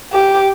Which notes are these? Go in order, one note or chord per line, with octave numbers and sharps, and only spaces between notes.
G4